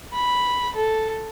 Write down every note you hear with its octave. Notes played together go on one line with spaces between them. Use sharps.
B5
A4